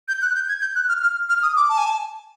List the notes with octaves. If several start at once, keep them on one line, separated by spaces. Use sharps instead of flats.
G6
F#6
G6
G#6
G6
F#6
F6
F6
F6
D#6
D6
A5
G#5
A5